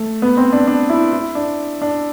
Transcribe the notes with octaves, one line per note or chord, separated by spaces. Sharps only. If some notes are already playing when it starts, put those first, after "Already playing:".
Already playing: A3
B3
C4
D4
D4
E4
E4
D4
D4